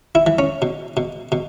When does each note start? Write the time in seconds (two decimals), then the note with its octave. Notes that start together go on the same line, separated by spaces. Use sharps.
0.15 E4
0.27 E3
0.39 C#4
0.62 B2
0.97 B2
1.32 B2